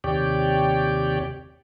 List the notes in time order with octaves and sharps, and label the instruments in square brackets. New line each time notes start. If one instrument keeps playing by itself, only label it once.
[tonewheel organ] D#2 C3 G4 C#5 D5 G5